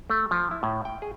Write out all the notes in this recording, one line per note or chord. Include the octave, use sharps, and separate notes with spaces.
A3
F3
E4
A2
G5
G#4